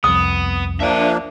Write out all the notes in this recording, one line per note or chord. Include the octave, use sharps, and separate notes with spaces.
C2 F2 B3 D#6
F3 A#3 D4 E5 G5